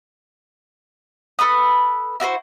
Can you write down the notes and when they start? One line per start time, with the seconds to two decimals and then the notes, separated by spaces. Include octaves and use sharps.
1.39 A4 B4 B5 D#6
2.20 E4 F#4 B4 C5